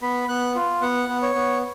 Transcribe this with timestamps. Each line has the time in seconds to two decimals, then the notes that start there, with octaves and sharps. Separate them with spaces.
0.02 B3 B5
0.29 B3 F#6
0.55 F4
0.82 B3 F#5
1.09 B3
1.22 C#5
1.35 B3